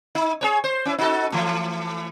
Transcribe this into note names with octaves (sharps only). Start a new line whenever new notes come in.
D#4
G#4 B4 C#5
C5
C#4 E4
D#4 F#4 A4
E3 A3